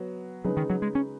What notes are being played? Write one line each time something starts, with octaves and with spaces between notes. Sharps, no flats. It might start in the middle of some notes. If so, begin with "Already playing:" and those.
Already playing: F#3 B3 F#4
C#3 F#3 G#3 D#4 B4
D#3
F#3
G#3
C#4